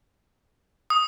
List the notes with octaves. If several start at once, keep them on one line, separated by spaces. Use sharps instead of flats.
D#6